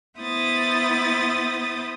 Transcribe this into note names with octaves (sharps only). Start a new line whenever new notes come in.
B3 E4 C5 D#6 A6